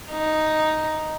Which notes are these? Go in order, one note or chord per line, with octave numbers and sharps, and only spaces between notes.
D#4